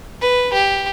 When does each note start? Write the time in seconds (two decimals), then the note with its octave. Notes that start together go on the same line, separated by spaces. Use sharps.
0.21 B4
0.53 G4